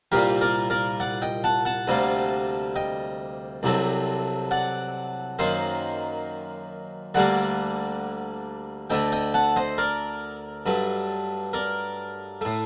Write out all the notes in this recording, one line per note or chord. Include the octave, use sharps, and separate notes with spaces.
C2 A#2 G3 A#3 G4 A#4
A#4 D5
A#4 D5
D5 F#5
D#5 G5
F#5 A5
F#5 A5
D2 C3 G3 A#3
D#5 G5
C2 C3 F#3 A3
D5 F#5
F#2 D#3 F#3 A#3 C5 D#5
D2 D3 G3 A#3 D5 F#5
D2 D3 A3 D#5 G5
D#5 G5
F#5 A5
C5 D#5
A#4 D5
G2 F#3 A3
A#4 D5
A2 A3